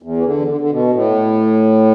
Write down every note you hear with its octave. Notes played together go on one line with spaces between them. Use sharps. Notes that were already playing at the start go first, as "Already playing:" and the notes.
E2
E3
D3
D3
D3
B2
A2